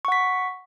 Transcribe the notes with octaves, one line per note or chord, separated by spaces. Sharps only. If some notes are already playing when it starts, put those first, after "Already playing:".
F#5 C#6 B6